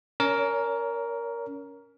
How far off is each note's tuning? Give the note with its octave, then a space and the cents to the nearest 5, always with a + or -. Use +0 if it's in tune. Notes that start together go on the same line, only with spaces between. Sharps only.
C#4 +20 A#4 +5 C#5 +40